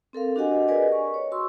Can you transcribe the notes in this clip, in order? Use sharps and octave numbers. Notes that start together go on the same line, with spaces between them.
C4 A4 A#4 F5
D4 F#4 G4 D#5 F#5 G#5
G#4 A#4 B4 D5 D#5 G#5
C#6
C#5
F#4 C6 C#6 E6